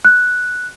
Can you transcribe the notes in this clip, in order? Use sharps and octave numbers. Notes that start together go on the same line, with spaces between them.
F#6